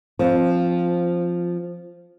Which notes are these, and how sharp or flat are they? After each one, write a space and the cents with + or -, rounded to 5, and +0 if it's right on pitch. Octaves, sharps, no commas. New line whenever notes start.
F3 +0 C4 +5